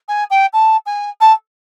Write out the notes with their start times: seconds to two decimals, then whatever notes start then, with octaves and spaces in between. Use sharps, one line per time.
0.08 G#5
0.30 G5
0.53 A5
0.86 G#5
1.21 A5